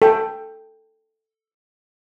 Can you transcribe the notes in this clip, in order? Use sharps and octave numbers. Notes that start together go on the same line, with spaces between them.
A4 G5